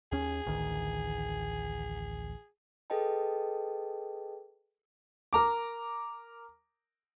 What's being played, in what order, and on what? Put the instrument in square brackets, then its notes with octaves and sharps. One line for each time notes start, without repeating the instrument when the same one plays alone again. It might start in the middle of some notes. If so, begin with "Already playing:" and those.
[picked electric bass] D#2 C#4 [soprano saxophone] G#4
[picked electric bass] A1 D2 D#3
[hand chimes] G#4 A4 B4 D#5 G5 A5
[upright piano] A#4 A#5 D6